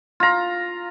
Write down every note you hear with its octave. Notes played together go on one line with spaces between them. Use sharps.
F4 A#5